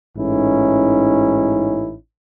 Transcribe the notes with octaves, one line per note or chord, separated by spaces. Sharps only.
A1 G#2 C#4 D#4 E4